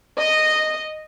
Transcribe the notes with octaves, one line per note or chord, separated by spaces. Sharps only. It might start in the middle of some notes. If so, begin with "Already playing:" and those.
D#5